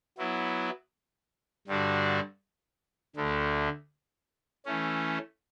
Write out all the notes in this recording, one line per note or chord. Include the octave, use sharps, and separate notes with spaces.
F#3 B3 E4
G2 D3 G3 D4 F#4
D2 D3 A3
E3 A3 C#4